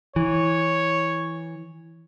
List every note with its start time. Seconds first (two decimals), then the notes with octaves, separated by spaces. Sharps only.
0.16 E3 C#5